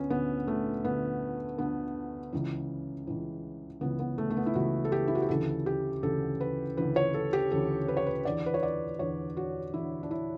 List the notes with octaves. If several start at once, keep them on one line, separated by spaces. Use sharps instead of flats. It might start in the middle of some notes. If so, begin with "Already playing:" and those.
Already playing: D2 D3 B3 C#4
D2 D3 B3
A3
D2 D3 B3
D2 D3 B3
C#2 C#3 E3
C#2 C#3 E3
C#2 C#3 E3 B3
B3
A3
A3
B3
E4
C#2 C#3 E3 F#4
A4
G4
E4
F#4
G4
D2 C#3 E3 A4
G4
D2 C#3 E3 A4
B4
D2 C#3 E3 B4
C#5
A4
G4
D2 C#3 E3 A4
B4
C#5
B4
E2 D3 D5
B4
C#5
D5
E2 D3 C#5
F#4
E2 D3 E4
D4
E4